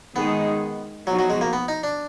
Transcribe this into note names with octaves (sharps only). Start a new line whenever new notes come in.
D#3 G#3 B3 D#4 G#4
F3 F#3 B3 D#4 F#4
F#3
G#3
A#3
B3
D#4
D4